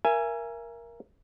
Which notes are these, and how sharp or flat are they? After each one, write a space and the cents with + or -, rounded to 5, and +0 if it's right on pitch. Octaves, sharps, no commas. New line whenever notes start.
A#4 +10 E5 +35 G#5 +0